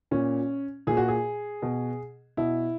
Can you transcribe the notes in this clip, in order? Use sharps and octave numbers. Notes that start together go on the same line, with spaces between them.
A#2 C#4
A#2 G#4
F#4
G#4
B2
B2 E4